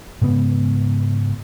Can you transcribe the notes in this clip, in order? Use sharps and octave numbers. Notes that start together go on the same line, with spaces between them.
G#2 C#3 B3